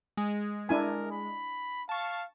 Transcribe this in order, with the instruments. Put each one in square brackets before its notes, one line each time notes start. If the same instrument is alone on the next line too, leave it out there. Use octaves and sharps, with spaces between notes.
[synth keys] G#3
[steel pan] D4 E4 G#5 [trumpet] A#4
[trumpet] B5
[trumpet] F5 [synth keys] A5 C#6